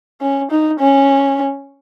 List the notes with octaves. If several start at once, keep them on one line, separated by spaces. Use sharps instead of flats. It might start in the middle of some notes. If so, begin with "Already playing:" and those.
C#4
D#4
C#4